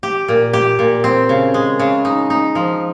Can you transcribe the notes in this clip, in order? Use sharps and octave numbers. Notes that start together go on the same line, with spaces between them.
G4
A#2
G4
A#2
C4
C#3
G#3
C#3
D#4
D#4
F3